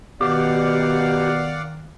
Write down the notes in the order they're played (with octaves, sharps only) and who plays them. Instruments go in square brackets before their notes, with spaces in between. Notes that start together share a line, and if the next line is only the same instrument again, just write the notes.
[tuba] B2 [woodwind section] D#3 [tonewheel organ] G4 [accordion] D5 F5 F#5